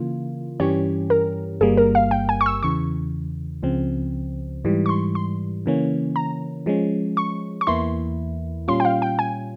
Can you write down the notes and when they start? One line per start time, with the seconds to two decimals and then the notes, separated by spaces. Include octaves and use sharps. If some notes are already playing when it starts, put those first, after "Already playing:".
Already playing: C#3 E3 A#3 F4
0.60 G2 E3 G3 C#4 G4 C#5
1.10 A#4
1.61 G1 G2 G3 A#3 G#4
1.77 A#4
1.95 F5
2.11 G5
2.29 G#5
2.41 C#6
2.46 E6
2.62 E2 C#3 E3 C#6
3.63 C#2 C#3 F3 C4
4.65 G#2 E3 G3
4.86 C#6
4.89 C6
5.15 C6
5.66 C#3 E3 A#3 C#4
6.16 A#5
6.66 F3 G#3 C#4
7.17 C#6
7.61 C#6
7.67 E2 E3 A#3 E4 C6
8.68 A#2 G3 C#4 F4 C6
8.80 G5
8.85 F5
9.02 G5
9.19 G#5